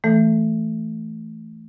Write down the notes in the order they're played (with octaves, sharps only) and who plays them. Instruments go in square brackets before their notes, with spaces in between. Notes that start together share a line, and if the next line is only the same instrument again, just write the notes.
[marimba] E3 A3 A4